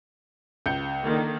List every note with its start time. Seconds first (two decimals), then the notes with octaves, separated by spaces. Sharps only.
0.66 C#2 G6 C#7
1.03 D3 D#3 A#3